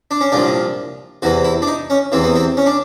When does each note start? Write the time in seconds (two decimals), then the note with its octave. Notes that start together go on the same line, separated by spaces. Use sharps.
0.11 D4
0.21 C#4
0.32 C2 A#2 F3 D4
1.22 E2 C3 E3 F#4
1.44 E4
1.62 D4
1.67 D#4
1.90 C#4
2.12 E2 C3 E3 C4
2.24 B3
2.36 C4
2.57 C#4
2.66 D4